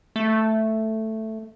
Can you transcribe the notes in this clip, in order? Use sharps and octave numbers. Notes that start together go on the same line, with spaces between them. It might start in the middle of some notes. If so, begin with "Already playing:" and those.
A3